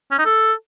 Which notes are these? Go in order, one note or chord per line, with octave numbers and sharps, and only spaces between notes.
C#4
D#4
A4